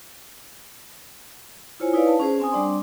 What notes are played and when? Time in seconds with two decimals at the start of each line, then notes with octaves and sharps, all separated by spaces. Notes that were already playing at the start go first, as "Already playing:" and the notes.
1.80 E4 F4 C5 C#5 G#5
1.93 D#4 E4 B4 C#5 D5 F5
2.07 A5
2.20 C#4 G#4 C5
2.40 C4 G#5 D#6
2.52 G3 D4 D5 C6